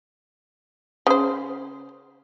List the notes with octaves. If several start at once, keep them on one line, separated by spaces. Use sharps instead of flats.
C#3 C5